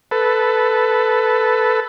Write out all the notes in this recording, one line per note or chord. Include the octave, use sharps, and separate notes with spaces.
A4 B4